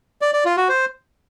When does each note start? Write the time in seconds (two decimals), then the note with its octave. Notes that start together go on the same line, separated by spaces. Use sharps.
0.22 D5
0.33 D5
0.45 F4
0.57 F#4
0.69 C5